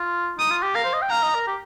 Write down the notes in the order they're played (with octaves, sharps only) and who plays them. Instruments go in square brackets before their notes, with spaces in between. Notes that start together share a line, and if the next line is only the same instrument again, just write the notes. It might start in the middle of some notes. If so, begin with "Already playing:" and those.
Already playing: [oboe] F4
[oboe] D#4 [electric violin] D#6
[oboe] F4
G4
[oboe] A#4 [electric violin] F5
[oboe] C5
D#5
G5
[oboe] F5 [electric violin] A#5
[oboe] D#5
A#4
G4